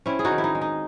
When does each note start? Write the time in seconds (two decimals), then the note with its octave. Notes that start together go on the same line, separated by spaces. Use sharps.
0.06 C4 C#4 E4
0.19 G#4
0.25 D#4 F#4
0.31 D#3
0.38 E4
0.44 D#4
0.55 G#3
0.61 D#4